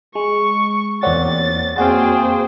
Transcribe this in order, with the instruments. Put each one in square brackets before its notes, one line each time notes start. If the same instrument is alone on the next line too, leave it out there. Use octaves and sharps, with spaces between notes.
[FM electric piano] G#3 [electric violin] C#6
[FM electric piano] E2 A#3 C4 [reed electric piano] C#5 D5 F#5 [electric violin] A6
[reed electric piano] F2 A#3 C4 [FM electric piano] F#4 F5 [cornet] G#4 [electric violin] C5 G5